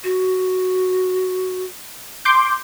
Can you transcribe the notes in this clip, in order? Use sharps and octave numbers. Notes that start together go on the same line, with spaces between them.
F#4
C6 D6 G6